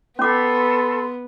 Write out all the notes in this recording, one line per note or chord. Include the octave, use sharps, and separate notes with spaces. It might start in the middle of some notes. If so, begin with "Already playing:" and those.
B3 C#4 A4 B5 C6 D6